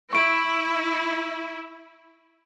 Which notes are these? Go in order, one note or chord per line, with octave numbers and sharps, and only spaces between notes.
E4 C#6 D7